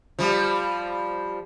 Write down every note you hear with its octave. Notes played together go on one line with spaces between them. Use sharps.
F3 G3